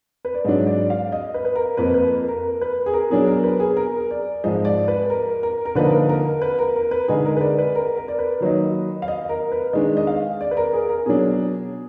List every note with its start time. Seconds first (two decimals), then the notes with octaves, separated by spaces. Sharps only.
0.25 B4
0.34 D5
0.45 G#2 F#3 D4 D#5
0.67 D5
0.90 F5
1.12 D#5
1.34 B4
1.45 B4
1.56 A#4
1.77 F2 F3 A#3 B4
1.94 B4
2.11 A#4
2.28 A#4
2.61 B4
2.86 G#4
2.93 A#4
3.10 B2 F#3 D4 G#4
3.27 A#4
3.44 B4
3.60 G#4
3.77 A#4
4.11 D5
4.44 G#2 F3 G#3 D#5
4.65 D5
4.88 B4
5.10 A#4
5.43 A#4
5.65 A#4
5.75 D3 F3 A#3 D#4 B4
5.92 A#4
6.09 A#4
6.42 B4
6.59 A#4
6.76 A#4
6.91 B4
7.08 D3 G#3 D#4 G#4
7.25 A#4
7.37 B4
7.41 D5
7.59 B4
7.75 A#4
7.98 A#4
8.08 D5
8.19 B4
8.41 D#3 F#3 A#3 D#4
9.02 F5
9.08 D#5
9.29 A#4
9.52 B4
9.73 D#3 G#3 D4 D#5
9.97 D#5
10.07 F5
10.41 D5
10.51 B4
10.57 A#4
10.73 G#4
10.89 A#4
11.06 B2 F#3 D4 G#4